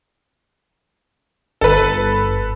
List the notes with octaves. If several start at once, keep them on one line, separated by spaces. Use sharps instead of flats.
G1 A4 B4